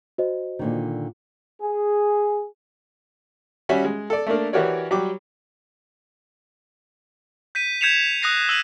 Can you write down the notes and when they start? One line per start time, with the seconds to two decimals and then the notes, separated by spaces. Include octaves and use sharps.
0.18 F#4 C5 D#5
0.59 A#2 D3 D#3
1.61 G#4
3.69 G3 C#4 F#4 E5 G#5
3.85 G#3
4.10 A4 D5
4.27 A3 A#3 D4 A#4
4.53 E3 F#4 G4 A#4 C#5 D5
4.91 F#3 G3 G5 D6
7.55 G6 B6 D#7
7.81 G6 G#6 B6 C#7 E7 F7
8.22 D#6 F#6 A#6 C7
8.49 E6 D#7 F#7